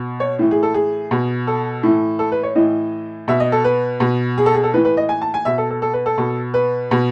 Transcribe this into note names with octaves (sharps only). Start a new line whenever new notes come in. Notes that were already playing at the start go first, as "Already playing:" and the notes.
Already playing: B2
C#5
A2 E3
G#4
A4
G#4
B2
A4
A2 E3
A4
B4
C#5
A2 E3 D#5
B2 E5
D#5
A4
B4
B2
G#4
A4
G#4
A4
A2 E3 B4
B4
D#5
G#5
A5
G#5
B2 E5
A4
A4
A4
B4
A4
B2
B4
B2